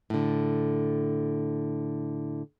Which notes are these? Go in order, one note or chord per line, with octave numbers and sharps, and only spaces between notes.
A2 D3